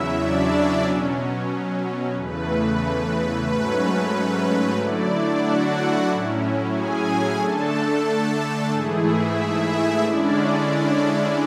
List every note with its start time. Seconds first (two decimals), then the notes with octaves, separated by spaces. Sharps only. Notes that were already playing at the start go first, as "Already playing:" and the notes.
Already playing: E2 C#3 F#3 C#4 E4 E5
0.18 D4 D5
0.50 D4 D5
0.83 B2 F#3 C#4
2.15 E2 C#3 E3 A3 B4
3.46 G#2 F#3 A3 C#4 B4
4.77 D3 F#3 A3 D4 E4 D5
5.10 D4 D5
5.43 F#4 F#5
6.08 A2 F#3 C#4 E4
6.74 G#4 G#5
7.39 D3 A3 D4 A4 A5
8.70 G#2 E3 A3 E4 G#4 G#5
9.03 E4 E5
9.36 E4 E5
9.69 E4 E5
10.02 D3 G#3 C#4 D4 E4 D5